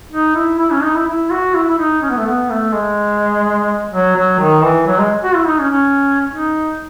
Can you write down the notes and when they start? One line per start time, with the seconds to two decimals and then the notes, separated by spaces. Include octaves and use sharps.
0.12 D#4
0.35 E4
0.59 E4
0.72 C#4
0.82 D#4
0.95 E4
1.07 E4
1.30 F#4
1.54 E4
1.69 E4
1.78 D#4
2.02 C#4
2.10 B3
2.17 A3
2.25 B3
2.50 A3
2.73 G#3
3.92 F#3
4.16 F#3
4.39 D#3
4.63 E3
4.87 F#3
4.98 G#3
5.23 F#4
5.35 E4
5.46 D#4
5.59 C#4
5.70 C#4
6.30 D#4